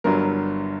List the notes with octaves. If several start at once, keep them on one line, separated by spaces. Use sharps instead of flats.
G1 G2 D3 F#3 A#4